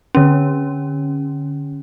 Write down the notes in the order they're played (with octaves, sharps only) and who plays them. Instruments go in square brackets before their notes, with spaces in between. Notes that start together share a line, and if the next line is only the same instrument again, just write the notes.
[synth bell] D3 C#4